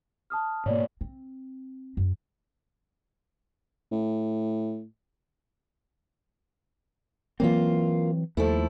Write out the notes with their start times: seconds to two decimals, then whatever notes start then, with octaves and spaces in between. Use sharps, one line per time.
0.30 A5 D#6 F6
0.66 G#2 B2 A#3 C#5 D5
1.01 C4
1.97 F#2
3.92 A2
7.40 E3 F#3 A#3 C4 F4
8.37 D#2 F3 A3 E4